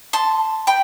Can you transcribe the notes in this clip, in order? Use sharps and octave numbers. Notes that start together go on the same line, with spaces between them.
A5 C6
G5 B5